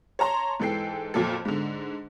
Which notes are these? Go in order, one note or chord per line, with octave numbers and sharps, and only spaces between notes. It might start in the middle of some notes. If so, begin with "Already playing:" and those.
C#5 A5 A#5 C6
G#2 E3 A4 G5 C7
F2 A#2 F#3 A4
G#2 D3